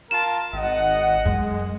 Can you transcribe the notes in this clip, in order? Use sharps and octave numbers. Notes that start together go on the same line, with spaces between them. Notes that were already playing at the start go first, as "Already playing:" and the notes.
F4 A#4 A5 E7
G#1 D#5 F#5
F#2 G#3